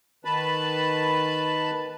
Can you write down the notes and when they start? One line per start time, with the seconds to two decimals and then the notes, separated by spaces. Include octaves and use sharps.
0.25 D#3 B4 A5 B5